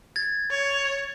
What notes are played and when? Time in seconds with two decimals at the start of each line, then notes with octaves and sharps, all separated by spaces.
0.16 G#6 A6
0.50 C#5